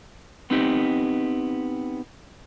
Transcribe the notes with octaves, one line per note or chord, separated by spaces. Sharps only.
B3 C4 D#4 G4